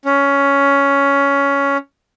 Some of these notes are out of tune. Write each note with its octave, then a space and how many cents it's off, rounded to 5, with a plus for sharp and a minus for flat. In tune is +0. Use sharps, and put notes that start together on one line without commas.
C#4 +10